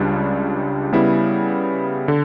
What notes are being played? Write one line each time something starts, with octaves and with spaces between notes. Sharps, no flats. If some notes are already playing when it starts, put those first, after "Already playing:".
Already playing: C#2 C#3 G3 D4
C#3 G3 B3 E4
D3